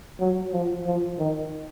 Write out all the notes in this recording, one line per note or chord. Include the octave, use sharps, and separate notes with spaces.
F#3
F3
F3
D#3